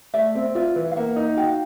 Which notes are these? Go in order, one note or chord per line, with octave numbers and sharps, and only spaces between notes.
A3 D5 E5
C4
F4 D5 E5
E3
F5
A#3 E5 F#5
D#4
F#4 F5 G5